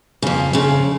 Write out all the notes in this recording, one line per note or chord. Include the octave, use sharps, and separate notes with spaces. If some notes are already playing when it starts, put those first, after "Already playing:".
F2 C#3
F2 C#3